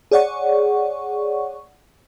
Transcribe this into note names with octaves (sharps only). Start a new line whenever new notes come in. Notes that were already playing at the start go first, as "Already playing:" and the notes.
G#4 C#5 D5 F#5 C#6